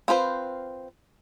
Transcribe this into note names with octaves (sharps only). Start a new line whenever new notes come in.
C4 F4 B4 C5